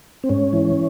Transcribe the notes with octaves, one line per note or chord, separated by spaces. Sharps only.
C4
G#2 C#4
E3